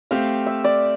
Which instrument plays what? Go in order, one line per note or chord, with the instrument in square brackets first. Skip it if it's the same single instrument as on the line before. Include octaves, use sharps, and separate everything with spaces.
[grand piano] A3 C4 G4 [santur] F5
[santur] E5
D5